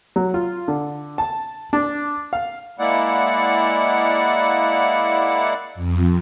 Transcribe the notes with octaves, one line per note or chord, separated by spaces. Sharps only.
F#3
F4
D3
A5
D4
F5
G#3 A#3 E4 D5 F#5
F2